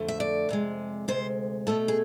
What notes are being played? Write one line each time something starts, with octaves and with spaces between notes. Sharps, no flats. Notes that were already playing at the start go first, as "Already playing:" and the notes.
Already playing: F2 D3 A3
E5
D5
F2 C3 G#3
D2 C3 G#3 C5
B2 A3 A4
G#4